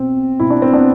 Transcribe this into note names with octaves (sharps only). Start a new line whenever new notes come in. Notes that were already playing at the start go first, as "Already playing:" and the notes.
Already playing: B2 C4
B2 E4
D4
C4
B3 D4